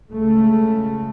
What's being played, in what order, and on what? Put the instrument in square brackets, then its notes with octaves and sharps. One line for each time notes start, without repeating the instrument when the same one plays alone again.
[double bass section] C#2 C#3 A3